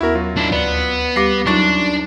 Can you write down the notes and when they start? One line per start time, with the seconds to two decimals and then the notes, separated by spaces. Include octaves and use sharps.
0.01 D#2 B3 E4 F#4 A#4 A#6
0.15 F#3 F4
0.37 D4 E4
0.52 D2 B3 D5
1.16 G3 G4 F5 D6 A#6 C7
1.46 F#2 F#3 D4 D#4 F4 C#6 A6